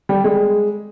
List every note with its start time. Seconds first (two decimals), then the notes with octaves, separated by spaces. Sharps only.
0.09 G3
0.24 G#3